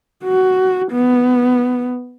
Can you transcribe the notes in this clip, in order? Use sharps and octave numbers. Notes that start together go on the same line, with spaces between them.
F#4
B3